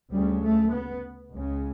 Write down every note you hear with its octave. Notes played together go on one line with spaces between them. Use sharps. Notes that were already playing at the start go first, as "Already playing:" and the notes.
D2 C#3 G3
A3
B3
C#2 C#3